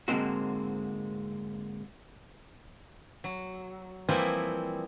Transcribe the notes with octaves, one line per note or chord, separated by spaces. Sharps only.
G#2 D3 G#3 A#3 C4 F#4
F#3
E3 F3 G3 A#3 C4 E4